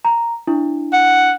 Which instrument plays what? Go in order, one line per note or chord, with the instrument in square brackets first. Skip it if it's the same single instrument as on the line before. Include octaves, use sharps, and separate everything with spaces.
[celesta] A#5
D4 E4
[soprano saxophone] F#5